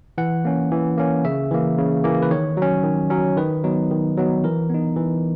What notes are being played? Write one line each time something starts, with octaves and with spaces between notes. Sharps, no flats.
E3 F#5
A#3 C#4
E3
A#3 C#4
C#3 E5
E3 A#3
C#3
E3 A#3
B4
D#3 C#5
F#3 C#4
D#3
F#3 C#4
D#3 B4
F#3 B3 D#4
D#3
F#3 B3 D#4
E3 A#4
B3 D#4
E3